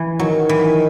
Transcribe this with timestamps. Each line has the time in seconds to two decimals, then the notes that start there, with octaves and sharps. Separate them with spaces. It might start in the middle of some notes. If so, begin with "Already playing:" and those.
Already playing: E3
0.19 D#3 F#3
0.49 E3